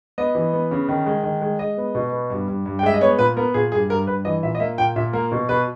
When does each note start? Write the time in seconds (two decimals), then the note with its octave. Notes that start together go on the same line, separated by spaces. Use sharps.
0.18 B3 D#5
0.35 E3
0.53 B3
0.71 C#3
0.89 D#3
1.06 G#3
1.24 D#3
1.42 G#3
1.59 G#3 D#5
1.78 B3
1.95 B2
2.12 B3
2.30 G2
2.48 G2
2.66 G2
2.79 G5
2.83 G#3 E5
2.94 D#5
3.01 B3 C#5
3.19 A#2 B4
3.37 B3 A#4
3.54 A#2 G#4
3.72 G2 G#4
3.89 G2 A#4
4.07 G2 B4
4.25 E3 D#5
4.43 A#2 E5
4.55 D#5
4.60 A#3 E5
4.78 A#2 G5
4.96 A#2 E5
5.13 A#3 A#4
5.32 B2
5.49 B2 B4